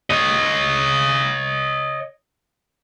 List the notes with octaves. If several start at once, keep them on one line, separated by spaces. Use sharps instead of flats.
C#5 D#5